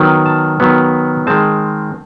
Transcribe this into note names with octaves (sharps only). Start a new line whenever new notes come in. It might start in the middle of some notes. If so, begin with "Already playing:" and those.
Already playing: D#3 F#3 B3
A5
D#3 F#3 B3
D#3 G#3 C4 A5